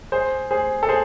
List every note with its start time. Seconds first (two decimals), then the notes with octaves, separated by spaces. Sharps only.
0.12 G#4 C5
0.51 G#4 C5
0.83 A4
0.89 G#4 C5